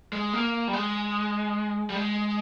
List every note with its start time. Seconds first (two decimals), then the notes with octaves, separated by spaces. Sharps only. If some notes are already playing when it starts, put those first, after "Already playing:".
0.13 G#3
0.33 A#3
0.68 G3
0.73 G#3
1.90 G3
1.95 G#3